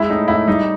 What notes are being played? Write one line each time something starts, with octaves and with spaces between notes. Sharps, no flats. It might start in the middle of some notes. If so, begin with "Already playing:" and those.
Already playing: G#3 E4
A2 D#4
A2 E4
G3 D#4